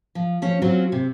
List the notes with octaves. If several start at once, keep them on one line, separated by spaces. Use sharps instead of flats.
F3
F3 C#4
F#3 C4 C#4 F4 F#4
C3